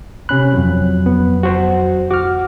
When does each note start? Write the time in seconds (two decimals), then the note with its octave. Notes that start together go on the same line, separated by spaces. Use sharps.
0.29 C3 C#4 B5 F#6
0.53 F2 F#3
1.06 B3
1.43 F#4 C5
2.11 F#4 D6 F6